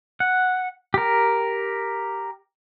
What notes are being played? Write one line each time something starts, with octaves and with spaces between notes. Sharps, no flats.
F#5
G4 A#4